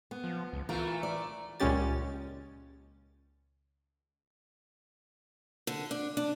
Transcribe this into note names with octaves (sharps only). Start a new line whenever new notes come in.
B3
F3
C#2
E3 A3 F4 A#4
D5
C#2 A#2 G#3 C#4 G4 A6
D3
D4
D4